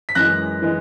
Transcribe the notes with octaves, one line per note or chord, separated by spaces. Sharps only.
B6
F#2 E3 G#3 F#6 A#6
E3 G#3